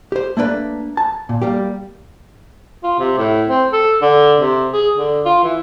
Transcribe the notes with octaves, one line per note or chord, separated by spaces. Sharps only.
G4 C5
A3 A#3 D4 B4
A5
A#2
G3 A#3 G4
F4
C3
A2
C4
A4
D3
C3
G#4
D3
F4
E3